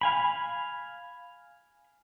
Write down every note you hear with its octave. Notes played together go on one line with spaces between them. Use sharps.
F5 G#5 B5